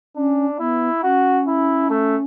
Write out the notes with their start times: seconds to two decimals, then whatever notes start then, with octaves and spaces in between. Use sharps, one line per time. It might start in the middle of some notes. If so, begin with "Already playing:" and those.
0.16 C#4 D4
0.59 B3 E4
1.03 C#4 F#4
1.47 E4
1.90 A3